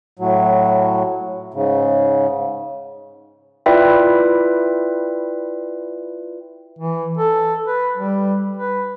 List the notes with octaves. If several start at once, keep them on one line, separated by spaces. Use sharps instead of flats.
A2 F#3
G#2 C#3
E4 F4 B4 D5 E5 G5
E3
A4
B4
G3
B4